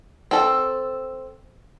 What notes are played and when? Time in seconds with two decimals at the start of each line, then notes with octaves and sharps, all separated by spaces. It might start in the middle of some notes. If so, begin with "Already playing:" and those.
0.31 C4 A4